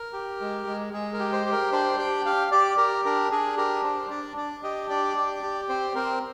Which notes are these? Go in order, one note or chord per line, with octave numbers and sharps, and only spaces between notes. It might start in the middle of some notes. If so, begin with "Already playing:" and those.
Already playing: A#4
G4
G#3
G#3
G#3 G#4
A#4
G4
C5
G4
A#4
D4 C5
G4 G5
G4 F5
G4 D5
G4 A#4
D4 A#4
D4 G#4
G4 A#4
D4 C5
D4 D5
D4 D5
G4 D#5
D4 D5
G4
G4
C4 C5
C4 A#4